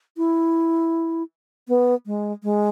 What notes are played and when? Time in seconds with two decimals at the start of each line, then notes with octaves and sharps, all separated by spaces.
0.17 E4
1.68 B3
2.06 G#3
2.43 G#3